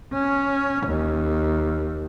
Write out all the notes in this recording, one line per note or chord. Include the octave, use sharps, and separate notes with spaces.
C#4
D#2